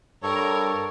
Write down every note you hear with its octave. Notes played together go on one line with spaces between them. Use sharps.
G2 A4 A#4 C#5